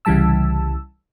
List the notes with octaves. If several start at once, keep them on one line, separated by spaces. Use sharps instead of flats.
C2 C#3 E3 G3 A5 E6